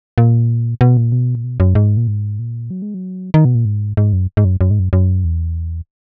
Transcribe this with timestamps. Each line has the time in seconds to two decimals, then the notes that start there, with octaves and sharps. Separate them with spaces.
0.18 A#2
0.81 B2
0.97 A#2
1.12 B2
1.35 A#2
1.44 B2
1.60 F#2
1.75 G#2
1.97 A#2
2.08 G#2
2.39 A#2
2.70 F#3
2.82 G#3
2.94 F#3
3.34 D#3
3.45 B2
3.55 A#2
3.65 G#2
3.97 G#2
4.13 F#2
4.37 G#2
4.45 F#2
4.61 F#2
4.71 G#2
4.79 F#2
4.93 F#2
5.24 E2